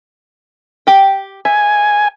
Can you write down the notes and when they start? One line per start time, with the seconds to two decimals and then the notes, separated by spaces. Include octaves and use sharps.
0.87 G4 G5
1.45 E5 G#5